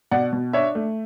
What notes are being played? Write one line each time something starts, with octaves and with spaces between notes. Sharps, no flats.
B2 D5 F#5
B2
D4 C#5 E5
A3